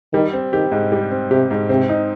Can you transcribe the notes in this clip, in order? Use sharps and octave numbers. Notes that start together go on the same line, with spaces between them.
D#3 G3
C4
D#3 G4
G#2
G3
C4
C3 G4
G#2
C3 C4
D#4